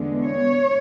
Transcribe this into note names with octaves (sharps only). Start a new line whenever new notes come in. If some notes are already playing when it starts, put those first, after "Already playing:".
Already playing: E2 D3 G#3 B3
C#5